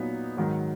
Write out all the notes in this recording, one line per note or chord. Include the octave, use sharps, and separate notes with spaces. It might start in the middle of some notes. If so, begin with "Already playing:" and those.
Already playing: A#2 F#3 B3 D#4
G#2 D#3 F#3